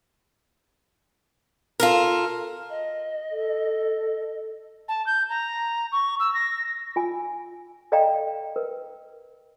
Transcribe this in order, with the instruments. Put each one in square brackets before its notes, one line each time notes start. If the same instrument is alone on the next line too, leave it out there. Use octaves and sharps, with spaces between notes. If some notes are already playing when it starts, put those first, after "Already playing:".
[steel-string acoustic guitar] F4 A4 A#4
[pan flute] D#5
[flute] A4
[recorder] A5
G6
A#5
C#6
E6
A#6
[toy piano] F4 G#5
A4 D5 D#5 F5 G5 A#5
A#4 B4